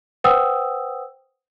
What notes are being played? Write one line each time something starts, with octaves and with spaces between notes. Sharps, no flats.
B4 C5 F#5 G5 D#6 E6